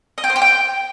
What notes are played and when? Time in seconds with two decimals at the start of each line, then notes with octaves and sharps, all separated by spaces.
0.18 D#5
0.24 G5
0.30 C5
0.36 G4
0.42 G5